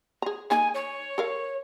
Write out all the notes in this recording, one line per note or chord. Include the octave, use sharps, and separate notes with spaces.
G#4 A#5
A#3 D#4 G#4 G#5
C#5
A4 A#4 F5